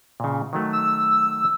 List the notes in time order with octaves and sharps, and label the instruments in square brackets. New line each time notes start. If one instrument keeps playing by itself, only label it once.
[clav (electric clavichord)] A#2 C#3
D#3 F#3 A3
[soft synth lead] E6